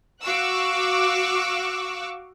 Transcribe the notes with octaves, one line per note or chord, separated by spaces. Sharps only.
F#4 F5 C#6 D6 E6 F#6